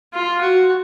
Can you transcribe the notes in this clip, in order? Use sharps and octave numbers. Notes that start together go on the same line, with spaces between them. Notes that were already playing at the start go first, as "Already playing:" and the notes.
F4
F#4